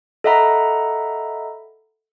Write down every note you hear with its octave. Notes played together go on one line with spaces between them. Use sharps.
A4 D#5 E5 F#5 A#5 B5